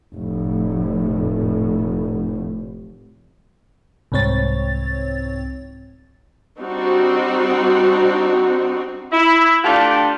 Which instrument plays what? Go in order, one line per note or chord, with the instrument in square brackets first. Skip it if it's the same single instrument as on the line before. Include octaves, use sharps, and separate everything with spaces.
[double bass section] F1 A2
[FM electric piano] C2 G#2 C4 C#5 A6
[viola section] G3 C4 D4 D#4 F#4
[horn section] E4
A3 D4 F4 G4